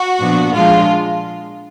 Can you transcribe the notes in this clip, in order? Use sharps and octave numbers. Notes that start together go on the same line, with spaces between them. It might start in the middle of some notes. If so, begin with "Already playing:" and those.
Already playing: F#4
A#2 F3 B3 D4
A#2 F3 G#3 D4 F4